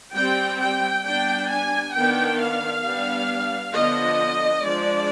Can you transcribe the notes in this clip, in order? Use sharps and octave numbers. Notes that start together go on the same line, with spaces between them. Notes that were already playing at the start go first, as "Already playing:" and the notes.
G3 C4 G5
G5
G3 B3 D4 G5
G#5
D#3 B3 D4 G5
F5
G3 B3 D4
D3 F3 B3 D4 D#5
F3 G#3 D4 D5